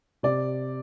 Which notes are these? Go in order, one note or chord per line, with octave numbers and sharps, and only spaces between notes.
C3 D5